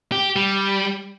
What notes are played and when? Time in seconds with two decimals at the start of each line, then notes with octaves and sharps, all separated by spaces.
0.12 G4
0.36 G3